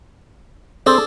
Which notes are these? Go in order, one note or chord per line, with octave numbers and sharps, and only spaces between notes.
C4 D4 G#4 A4